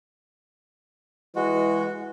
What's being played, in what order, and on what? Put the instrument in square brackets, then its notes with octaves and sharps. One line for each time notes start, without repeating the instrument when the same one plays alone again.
[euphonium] E3 [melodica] G#3 F#4